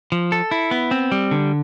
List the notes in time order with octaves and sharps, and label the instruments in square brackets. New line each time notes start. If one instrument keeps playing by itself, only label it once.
[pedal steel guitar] F3
A4
E4
B3
C4
G3
D3